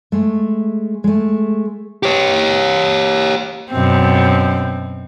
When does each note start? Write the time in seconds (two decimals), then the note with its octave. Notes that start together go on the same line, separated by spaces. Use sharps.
0.12 G#3 A3
1.04 G#3 A3
2.03 G4 C#5
3.70 F#2 B2 C4